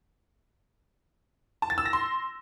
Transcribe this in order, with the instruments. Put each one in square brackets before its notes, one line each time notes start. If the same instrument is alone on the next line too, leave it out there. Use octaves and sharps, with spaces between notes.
[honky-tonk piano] A5
A6
E6
A#6
C6